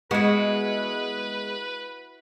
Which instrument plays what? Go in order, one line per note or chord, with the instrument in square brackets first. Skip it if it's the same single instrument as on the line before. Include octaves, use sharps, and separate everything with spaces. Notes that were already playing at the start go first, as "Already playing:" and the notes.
[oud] G#3 B3 [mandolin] E4 F#4 [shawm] B4